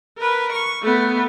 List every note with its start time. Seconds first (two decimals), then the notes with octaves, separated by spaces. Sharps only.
0.18 A#4 B4
0.52 C#6
0.82 A3 B3